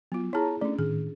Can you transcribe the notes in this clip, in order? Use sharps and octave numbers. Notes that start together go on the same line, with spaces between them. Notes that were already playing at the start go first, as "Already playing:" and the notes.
F#3 B3 F4
E4 G#4 C#5 A5 A#5
A3 C#4 D4 D5
A2 D#3 G#4